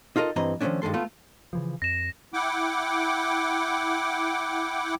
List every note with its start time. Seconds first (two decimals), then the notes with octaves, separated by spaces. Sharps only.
0.16 D#4 F4 A4 A#4 D#5
0.36 G2 E3 C4 D#5 A#5
0.61 D#3 F3 F#3 A3 C#4 D4
0.82 G2 D#3 G#3 A4 C6
0.94 A3 B3 F4 A4
1.53 C#3 E3 F3
1.82 F2 A#6 E7
2.33 E4 F#5 G5 D6